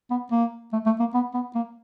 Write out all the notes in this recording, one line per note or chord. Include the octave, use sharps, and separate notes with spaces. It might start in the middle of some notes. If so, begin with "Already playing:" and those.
B3
A#3
A3
A3
A#3
B3
B3
A#3